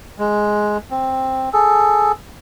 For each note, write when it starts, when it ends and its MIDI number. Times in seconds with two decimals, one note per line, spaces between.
0.19 0.78 56
0.91 1.49 60
1.53 2.12 68
1.53 2.12 69